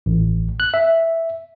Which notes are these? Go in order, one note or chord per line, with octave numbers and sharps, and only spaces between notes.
A1
F#6
E5